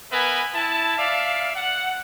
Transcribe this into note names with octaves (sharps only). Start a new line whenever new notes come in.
B3 A#4 B4 E5 G#5
E4 A5
D5 E5 F5
F#5